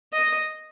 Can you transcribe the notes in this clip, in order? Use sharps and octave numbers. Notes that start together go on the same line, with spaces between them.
D#5